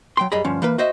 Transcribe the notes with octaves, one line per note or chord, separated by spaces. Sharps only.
F#3 G5 C6
F#2 G3 G#4 D#5 A#5 B5
D2 G2 F3 C#4
E3 A#3 B4
F#4 C5 D#5 E5